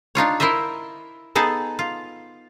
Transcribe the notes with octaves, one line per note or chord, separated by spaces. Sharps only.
D4 D#4 F4 C#5
E4 A#4 C5 D#5 E5
B3 D#4 G#4 A4 A5
F4